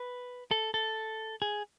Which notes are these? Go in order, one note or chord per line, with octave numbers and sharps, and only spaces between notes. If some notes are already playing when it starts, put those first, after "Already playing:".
Already playing: B4
A4
A4
G#4